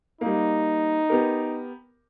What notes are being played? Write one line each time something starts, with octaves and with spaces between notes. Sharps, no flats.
G3 A#3 D#4
B3 G4 A#4